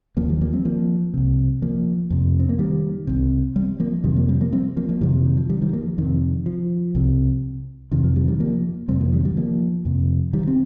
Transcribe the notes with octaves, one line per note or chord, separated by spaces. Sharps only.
D#2 F3 A#3
D#3 G3
F3 A#3
G3 C4
F3 A#3
C2 C3
F3 A#3
F2 C3
C4
A#3
D#3 G3
C2 C3
G3 C4
F3 A#3
F2 C3 D#3 G3
F3 A#3
G3 C4
F3 A#3
G3 C4
F3 A#3
F3 A#3
F2 C3 D#3 G3
F3
D#3
F3
D#3 G3
D#3 G3
F3 A#3
F2 C3 D#3
F3
C2 C3
F2 C3 D#3
F3
D#3 G3
D#3 G3
F3 A#3
F2 C3 G3 C4
F3 A#3
D#3 G3
F3
D#3 G3
F3 A#3
F2 C3
D#3 G3
C4